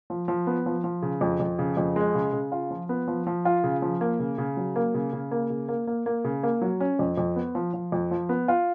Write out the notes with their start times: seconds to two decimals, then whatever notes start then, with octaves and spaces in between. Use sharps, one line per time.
0.10 F3
0.28 F3
0.47 B3
0.66 F3
0.84 F3
1.02 C#3
1.21 F2
1.40 F2
1.59 C#3
1.77 F2
1.96 G#3
2.15 C#3
2.33 C#3
2.52 F4
2.71 F3
2.89 B3
3.08 F3
3.27 F3
3.45 F4
3.64 C#3
3.82 F3
4.01 A#3
4.19 C#3
4.38 C#3
4.57 F#3
4.76 A#3
4.94 C#3
5.13 C#3
5.31 A#3
5.50 C#3
5.68 A#3
5.87 A#3
6.06 A#3
6.24 C#3
6.43 A#3
6.62 F#3
6.80 C#4
6.99 F2
7.17 F2
7.36 B3
7.55 F3
7.74 F3
7.92 F2
8.11 F3
8.29 B3
8.48 F4